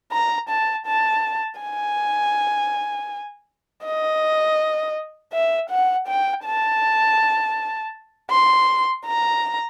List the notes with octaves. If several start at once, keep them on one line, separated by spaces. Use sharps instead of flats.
A#5
A5
A5
G#5
D#5
E5
F#5
G5
A5
C6
A#5